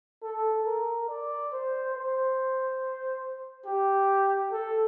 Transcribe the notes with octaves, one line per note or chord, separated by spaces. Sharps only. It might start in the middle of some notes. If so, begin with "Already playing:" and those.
A4
A#4
D5
C5
C5
G4
A4